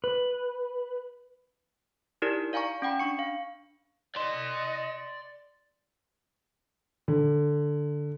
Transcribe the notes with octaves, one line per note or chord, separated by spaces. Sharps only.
B4
D#4 E4 G4 A#4 D5
D5 F5 G#5 A#5 C#6
C#4 F#5 G5 B5
D4 C#6 C#7
F5
D5 D#5 C6
D3